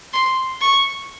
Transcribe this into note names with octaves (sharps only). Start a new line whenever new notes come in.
C6
C#6